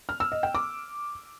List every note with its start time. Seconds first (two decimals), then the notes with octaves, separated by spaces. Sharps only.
0.09 F6
0.20 E6
0.32 D#5
0.43 G5
0.55 D6